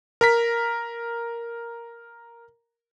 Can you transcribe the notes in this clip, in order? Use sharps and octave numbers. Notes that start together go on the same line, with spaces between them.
A#4 A#5 B6